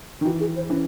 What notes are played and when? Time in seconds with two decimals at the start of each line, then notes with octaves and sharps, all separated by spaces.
0.21 D#3
0.25 E3 F#4
0.40 G#4
0.56 C5
0.70 E3 C#4